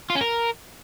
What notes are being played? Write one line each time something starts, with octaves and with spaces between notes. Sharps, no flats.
F4
C#4
A#4